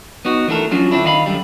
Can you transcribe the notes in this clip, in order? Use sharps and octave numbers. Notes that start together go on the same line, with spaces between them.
B3 D#4 F#4
E3 A3 D4 F4 A4 A#4
F3 F#3 C#4 D4 F4 F#4
D3 C4 D4 E4
D#3 D#5 F5 B5
F#2 D3 G3